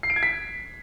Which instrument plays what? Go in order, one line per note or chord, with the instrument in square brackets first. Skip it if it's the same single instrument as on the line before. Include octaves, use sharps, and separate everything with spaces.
[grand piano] C7
D7
G#6
B6